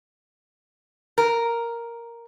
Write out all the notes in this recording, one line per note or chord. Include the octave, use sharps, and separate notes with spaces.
A#4